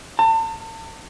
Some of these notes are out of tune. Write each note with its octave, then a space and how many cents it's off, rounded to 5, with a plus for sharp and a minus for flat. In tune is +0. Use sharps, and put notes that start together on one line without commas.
A5 +35